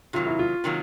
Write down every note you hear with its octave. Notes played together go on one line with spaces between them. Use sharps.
C3 D#3 F#3 A#3 F4
E4
F4
C3 D#3 F#3 A#3